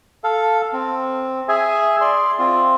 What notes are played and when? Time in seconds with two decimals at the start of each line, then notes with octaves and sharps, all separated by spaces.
0.24 A4 F5
0.73 C4
1.48 G#4 E5 G#5
2.01 D5 C6
2.39 C4 F4